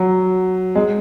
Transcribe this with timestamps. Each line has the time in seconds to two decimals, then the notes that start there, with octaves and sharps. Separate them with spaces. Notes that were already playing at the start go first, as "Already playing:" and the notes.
Already playing: F#3
0.75 G#3